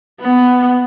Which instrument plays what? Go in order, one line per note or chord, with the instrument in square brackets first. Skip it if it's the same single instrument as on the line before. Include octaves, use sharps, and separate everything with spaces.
[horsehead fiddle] B3